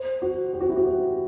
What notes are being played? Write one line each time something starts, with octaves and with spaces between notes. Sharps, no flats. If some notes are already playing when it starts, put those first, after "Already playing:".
Already playing: C5
F#4
G4
F#4
E4
F#4
G4